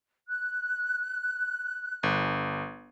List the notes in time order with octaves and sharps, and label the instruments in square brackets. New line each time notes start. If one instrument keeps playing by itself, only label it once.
[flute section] F#6
[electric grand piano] G1